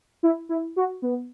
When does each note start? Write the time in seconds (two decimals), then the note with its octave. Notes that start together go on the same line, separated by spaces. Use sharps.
0.23 E4
0.49 E4
0.76 F#4
1.02 B3